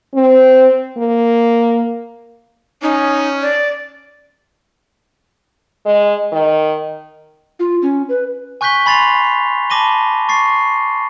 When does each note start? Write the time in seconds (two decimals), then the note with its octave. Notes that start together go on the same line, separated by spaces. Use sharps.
0.15 C4
0.98 A#3
2.82 C#4 D#4
3.42 D5
5.86 G#3
6.33 D#3
7.59 F4
7.82 C#4
8.09 B4
8.61 G#5 C#6 F#6 G6 B6 G7
8.86 G#5 B5 C6 A6 C7 F7
9.70 A5 B5 D6 A#6 D#7 G7
10.29 C#6 A6 C7